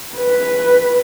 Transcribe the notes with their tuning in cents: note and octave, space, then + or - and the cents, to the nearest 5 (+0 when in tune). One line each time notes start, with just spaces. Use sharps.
B4 +0